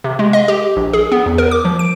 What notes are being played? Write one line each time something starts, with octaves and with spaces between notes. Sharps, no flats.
C3
G#3
D#5
G4
A#1
G#4
B3
E2
A#4
D6
F3
D7